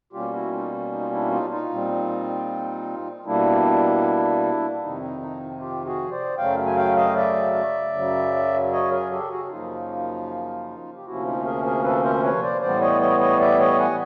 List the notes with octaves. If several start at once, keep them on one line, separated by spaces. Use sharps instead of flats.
B2 G3 A#3 C#4 F4 G4
E4 F#4
D#4 F4
D#4
F4
D4 E4
D#4 F4
D#4 F4
A#2 G3 C4
B2 G3 A#3 D4 E4
F2 C3 D#3 D#4
D#4
D#4
F4 G4
F#4 G#4
C5 D5
F#2 C#3 F#3 A3 F5 G5
G#5
F5 G5
D#5 F5
D5 E5
F#2 C#3 F#3
C#5 D#5
G#4 A#4
G4 A4
F#4 G#4
F#4
F#2 C#3 F3 A#3 D#4 F4
G4
D2 C3 F3 A#3 C#4 E4 F#4
D#4 F4
G#4 A#4
G#4 A#4
A4 B4
A#4 C5
B4 C#5
C5 D5
A2 E3 G3 B3 C5 D5
C#5 D#5
C#5 D#5
C#5 D#5
D5 E5
C#5 D#5
F#5 G#5